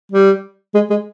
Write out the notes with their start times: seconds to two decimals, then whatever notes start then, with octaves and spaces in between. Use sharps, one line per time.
0.12 G3
0.74 G#3
0.90 G#3